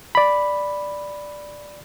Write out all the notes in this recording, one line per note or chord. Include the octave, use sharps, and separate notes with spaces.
D5 B5